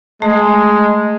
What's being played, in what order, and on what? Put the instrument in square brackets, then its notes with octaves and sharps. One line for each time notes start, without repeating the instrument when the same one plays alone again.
[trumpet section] G#3 [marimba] A3